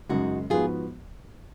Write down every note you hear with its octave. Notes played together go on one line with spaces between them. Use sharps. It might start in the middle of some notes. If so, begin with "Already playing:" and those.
F#2 C#3 G#3 D#4 F#4
G#2 F3 B3 F4 F#4 G#4